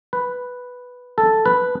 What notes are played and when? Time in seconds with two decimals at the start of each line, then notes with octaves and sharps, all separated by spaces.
0.13 B4
1.18 A4
1.46 B4